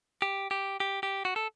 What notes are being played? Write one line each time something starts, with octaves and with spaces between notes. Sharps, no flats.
G4
G4
G4
G4
F#4
A4